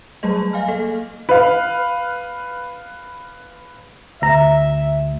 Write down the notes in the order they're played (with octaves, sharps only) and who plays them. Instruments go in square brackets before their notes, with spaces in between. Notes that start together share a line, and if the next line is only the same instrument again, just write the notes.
[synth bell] F#3 G3 A3 G#4 D#5
F5 G#5 F6
A#3 A4 D#5
[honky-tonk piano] B4 F5
[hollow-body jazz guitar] D2 A#5 [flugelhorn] E5